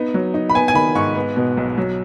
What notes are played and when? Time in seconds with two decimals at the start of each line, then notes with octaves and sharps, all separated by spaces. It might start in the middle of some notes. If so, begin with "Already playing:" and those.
Already playing: B3 D#4
0.14 F#3
0.34 D#4
0.50 B5
0.55 B3 G#5
0.68 G#5
0.74 D#3 B5
0.95 G#2 C#6
1.15 B3
1.36 B2
1.57 B1
1.78 F#3